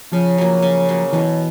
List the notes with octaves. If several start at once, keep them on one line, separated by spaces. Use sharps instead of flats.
C#3 F3
F#3 A#3
C#3
F#3 A#3
B2 E3